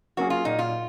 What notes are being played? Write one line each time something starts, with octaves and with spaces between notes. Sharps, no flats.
F#3 A#3 C#4 F#4 G#4
F4
A#2 D#4
F4